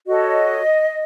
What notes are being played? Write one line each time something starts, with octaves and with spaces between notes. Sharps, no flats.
F#4 A4 C#5 D#5